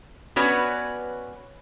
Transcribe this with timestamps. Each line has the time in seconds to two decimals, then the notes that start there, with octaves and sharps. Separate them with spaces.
0.36 B3 C#4 F#4 B4 C#5 D5